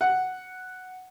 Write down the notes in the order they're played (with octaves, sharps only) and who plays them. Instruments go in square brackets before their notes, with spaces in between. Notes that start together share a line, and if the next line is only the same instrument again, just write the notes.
[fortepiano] F#5